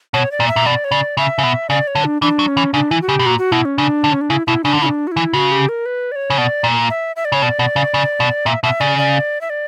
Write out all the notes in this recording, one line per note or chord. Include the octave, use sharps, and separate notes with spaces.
B2 C#5
D5
A#2
E5
A#2
B2 D5
C#5
C#3 D5
C#3 E5
C#3
B2
C#3 D5
C#5
D3
D4
E3 D4
F#3
C#4
E3
C#3 D4
E3 E4
F#4
C#3 G4
B2
A#2 F#4
F#4
B2 E4
C#4
C#3 D4
D3
C#4
D4
C#3 E4
B2 E4
C#3 D4
D3
C#3 E4
D4
F#4
E3 E4
C#3 F#4
G4
A#4
B4
D5
C#5
C#3
B2 D5
A#2
E5
E5
D5
C#3 C#5
B2 D5
B2
C#3
C#3
B2
A#2 E5
B2 E5
C#3 D5
D5
E5
D5